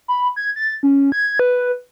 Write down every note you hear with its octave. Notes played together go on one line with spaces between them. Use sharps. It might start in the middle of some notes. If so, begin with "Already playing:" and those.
B5
G#6
A6
C#4
G#6
B4